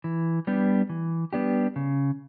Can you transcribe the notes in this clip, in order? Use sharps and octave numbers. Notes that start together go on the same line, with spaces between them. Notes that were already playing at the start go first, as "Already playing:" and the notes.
E3
G3 B3 D4 G4
E3
G3 B3 D4 G4
C#3